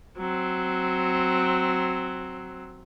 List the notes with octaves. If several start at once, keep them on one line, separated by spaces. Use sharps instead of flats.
F#3 C4